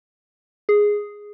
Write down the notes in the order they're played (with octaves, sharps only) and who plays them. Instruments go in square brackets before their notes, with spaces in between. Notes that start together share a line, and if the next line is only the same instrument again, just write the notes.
[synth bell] G#4